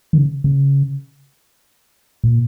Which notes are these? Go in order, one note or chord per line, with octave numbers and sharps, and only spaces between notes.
D#3
C#3
C#3
A#2